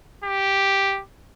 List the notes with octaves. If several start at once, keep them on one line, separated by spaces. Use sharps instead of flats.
G4